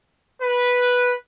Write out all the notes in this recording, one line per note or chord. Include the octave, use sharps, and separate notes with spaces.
B4